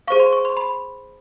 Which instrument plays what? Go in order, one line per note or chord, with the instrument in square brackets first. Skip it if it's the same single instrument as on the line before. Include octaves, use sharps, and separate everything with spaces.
[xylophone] G#4 C5 F5 C#6
C6
C#6
C6
B5